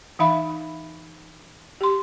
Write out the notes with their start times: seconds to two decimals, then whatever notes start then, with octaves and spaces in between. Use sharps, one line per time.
0.19 E3 D#4 E5 F5 B5
1.81 G4 C6